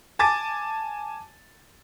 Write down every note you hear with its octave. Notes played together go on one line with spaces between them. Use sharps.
G#5 A5 D6 A6